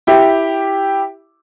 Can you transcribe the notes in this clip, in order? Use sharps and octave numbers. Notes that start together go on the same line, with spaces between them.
E4 G4